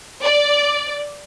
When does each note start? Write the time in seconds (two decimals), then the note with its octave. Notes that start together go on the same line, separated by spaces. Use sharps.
0.22 D5